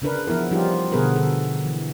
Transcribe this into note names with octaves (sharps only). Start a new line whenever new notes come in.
C#3 D4 A#4 B4
E3 F3 B3 E4 A#4
F3 G3 C#4 D#4 F4 G4
B2 D3 B3 G#4 A#4 B4
D3 A4
E3